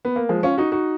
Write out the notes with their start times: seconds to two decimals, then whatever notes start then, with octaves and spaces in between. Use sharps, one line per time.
0.05 B3
0.16 A#3
0.29 F3 G#3
0.43 C#4 F4
0.58 D#4 F#4
0.72 D#4 F#4